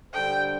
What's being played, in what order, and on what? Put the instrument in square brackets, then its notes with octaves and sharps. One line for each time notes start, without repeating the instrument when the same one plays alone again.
[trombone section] D3 G3 D4 A4 C5 [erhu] G5